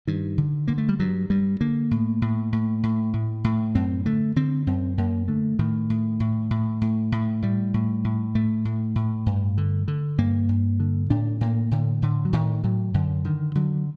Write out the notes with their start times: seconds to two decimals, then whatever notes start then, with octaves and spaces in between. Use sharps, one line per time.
0.07 G2 D#3
0.38 D3
0.68 D3 A#3
0.78 A3
0.89 G3
0.99 G2 F#3
1.30 G2 G3
1.61 D3 A#3
1.91 A2
2.22 A2
2.52 A2
2.83 A2
3.13 A2
3.44 A2
3.75 F#2 C4
4.06 D3 A3
4.36 D3 C4
4.67 F#2 C4
4.98 F#2 A#3
5.28 D3 A3
5.59 A2 D#3
5.90 A2
6.20 A2
6.51 A2
6.81 A2
7.12 A2
7.42 A2 G3
7.74 A2
8.04 A2
8.35 A2 A3
8.65 A2
8.96 A2
9.26 G2
9.58 D3
9.88 D3
10.18 G2 A#3
10.49 G2
10.80 D3
11.10 A2 D4
11.41 A2 A#3
11.71 A2 D3
12.02 A2 D3
12.25 F#3
12.33 A2 D#3
12.64 A2 F#3
12.94 F#2 D3
13.25 D3 D#3
13.55 D3 F#3